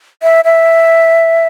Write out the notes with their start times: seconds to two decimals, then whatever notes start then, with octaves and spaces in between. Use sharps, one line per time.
0.23 E5
0.45 E5